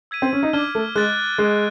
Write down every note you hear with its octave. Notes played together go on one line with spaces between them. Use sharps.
E6 G#6 B6 D#7
C4
C#4
D#4
D4 D6 F6 G#6
A3
G#3 F#6 A6 D7
G#3 F6 A6 D7